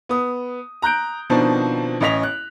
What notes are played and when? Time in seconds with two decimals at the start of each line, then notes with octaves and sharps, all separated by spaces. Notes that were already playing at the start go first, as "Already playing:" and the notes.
0.09 B3 D#6
0.82 A#5 F#6 G6 D7
1.30 B2 D#3 F3 C4 D4 D#4
2.01 A1 C#4 D#5 B6 F7
2.23 F#6